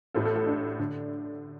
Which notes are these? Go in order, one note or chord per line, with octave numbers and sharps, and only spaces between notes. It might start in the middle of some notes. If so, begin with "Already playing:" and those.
A1 A2 A3 A4
A4
A4
D4
D3